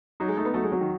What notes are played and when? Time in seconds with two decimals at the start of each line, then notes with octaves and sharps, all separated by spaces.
0.20 F#3 D#4
0.28 G#3
0.37 A3 D#4
0.45 B3
0.54 F#3 A3
0.64 G#3
0.72 F#3
0.81 D#3